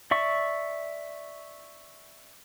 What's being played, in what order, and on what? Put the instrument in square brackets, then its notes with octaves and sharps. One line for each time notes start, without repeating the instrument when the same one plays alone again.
[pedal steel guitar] D5 E5 C#6